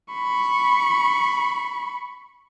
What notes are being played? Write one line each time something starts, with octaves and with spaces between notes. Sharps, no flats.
B5 C#6